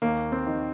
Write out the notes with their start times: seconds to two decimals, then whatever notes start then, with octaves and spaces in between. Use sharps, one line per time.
0.02 D#2 A#3
0.32 C4
0.47 D#3